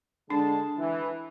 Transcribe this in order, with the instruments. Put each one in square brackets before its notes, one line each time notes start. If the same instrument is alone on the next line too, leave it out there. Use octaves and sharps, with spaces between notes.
[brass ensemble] D3 G#3 A5 [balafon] D4
[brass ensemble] E3